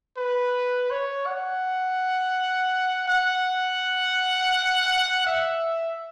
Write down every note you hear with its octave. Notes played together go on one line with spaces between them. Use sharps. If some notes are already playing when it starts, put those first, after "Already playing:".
B4
C#5
F#5
F#5
E5